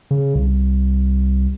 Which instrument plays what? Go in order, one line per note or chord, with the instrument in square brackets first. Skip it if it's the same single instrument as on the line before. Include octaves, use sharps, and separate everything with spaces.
[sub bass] C#3
C2